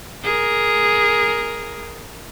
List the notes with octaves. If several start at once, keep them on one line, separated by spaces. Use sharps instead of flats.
G#4 A#4